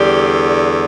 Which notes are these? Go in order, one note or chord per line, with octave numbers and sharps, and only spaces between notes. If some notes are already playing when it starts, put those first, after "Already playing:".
Already playing: E2 D3 G3